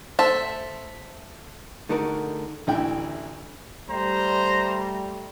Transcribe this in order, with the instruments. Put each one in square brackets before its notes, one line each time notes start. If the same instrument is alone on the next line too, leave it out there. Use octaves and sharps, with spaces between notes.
[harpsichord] A3 [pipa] C5 [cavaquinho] E5 [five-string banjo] A5
[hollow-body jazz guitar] D3 A3 D#4 F#4 G#4 A#4
[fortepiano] A1 D2 E4 G5
[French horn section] G3 A3 [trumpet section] C5 A#5